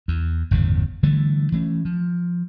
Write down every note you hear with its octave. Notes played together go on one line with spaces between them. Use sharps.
E2
G1 E2 A2 C#3
D3 E3 G3 A3
E3 A3 C#4
F3